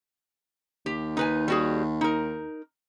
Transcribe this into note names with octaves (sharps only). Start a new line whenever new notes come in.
D#2 G4
D#4 B4 G#5
G3 F#4 G#4
D#4 A#4